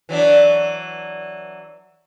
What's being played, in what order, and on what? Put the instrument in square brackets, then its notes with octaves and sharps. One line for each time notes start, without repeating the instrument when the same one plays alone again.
[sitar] E3 F#3 D4